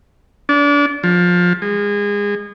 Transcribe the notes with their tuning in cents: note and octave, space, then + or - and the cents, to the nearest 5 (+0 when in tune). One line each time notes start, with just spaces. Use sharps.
D4 -30
F3 +20
G#3 -25